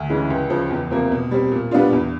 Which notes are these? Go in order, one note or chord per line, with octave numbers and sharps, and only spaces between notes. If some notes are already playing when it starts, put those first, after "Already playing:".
Already playing: D2
C#3 E3 G#3
C#2
C#3 F3
E2
C3 F3 A#3
B2
G3 C4
A#2
G3 B3 D4 F4
E2